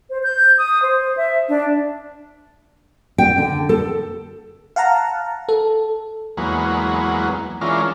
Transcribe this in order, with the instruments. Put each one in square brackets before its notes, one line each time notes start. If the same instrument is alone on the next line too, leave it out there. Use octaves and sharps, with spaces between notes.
[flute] C5
G6
D#6
C5
E5
D4
[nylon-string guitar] G5
D3
A4
[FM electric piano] F5 F#5 A5 A#5
A4
[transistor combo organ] E2 F#3 G#3 A#3 B3
E3 G#3 C#4 D4 F4 A#4